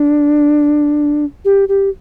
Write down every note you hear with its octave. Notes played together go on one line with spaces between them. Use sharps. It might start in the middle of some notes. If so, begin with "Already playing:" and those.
Already playing: D4
G4
G4